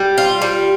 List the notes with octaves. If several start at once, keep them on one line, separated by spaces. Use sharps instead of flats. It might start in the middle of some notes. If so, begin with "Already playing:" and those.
Already playing: G3
F4
G3